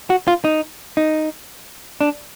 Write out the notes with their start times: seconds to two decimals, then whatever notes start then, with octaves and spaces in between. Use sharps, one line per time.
0.10 F#4
0.28 F4
0.44 D#4
0.97 D#4
2.01 D4